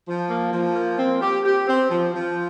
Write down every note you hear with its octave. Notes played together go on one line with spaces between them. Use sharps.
F3
A#3
F3
A#3
C4
G4
G4
C4
F3
F3